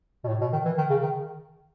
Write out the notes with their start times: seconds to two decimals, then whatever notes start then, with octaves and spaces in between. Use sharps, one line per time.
0.24 B2
0.28 A2
0.41 B2
0.53 D#3
0.65 E3
0.78 D#3
0.90 C#3
1.03 D#3